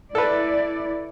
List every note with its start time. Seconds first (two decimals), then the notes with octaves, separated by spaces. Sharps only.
0.15 E4 A4 B4 D5